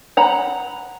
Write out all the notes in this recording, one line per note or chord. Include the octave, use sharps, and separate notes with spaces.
F#5 A#5 B5